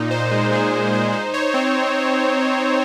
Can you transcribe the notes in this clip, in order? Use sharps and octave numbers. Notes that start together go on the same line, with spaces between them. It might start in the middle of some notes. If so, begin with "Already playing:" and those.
Already playing: A#2 D#4
C5
G#3
G#4
D#4
C5
D#4
C#5
C4